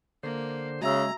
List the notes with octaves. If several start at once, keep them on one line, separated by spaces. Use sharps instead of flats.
D3 A#3 C5
C#3 G#3 F#4 E5 A#5 E6